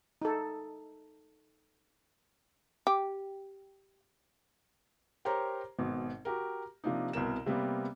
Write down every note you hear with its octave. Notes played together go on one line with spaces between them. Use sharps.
D#4 A4
G4
G4 A#4 C5 C#5 A#5
G#1 B2
F#4 G4 A#4
C3 F3 A#3 D4 D#4
C2 B2 A#4 E7
C3 G3 A#3 B3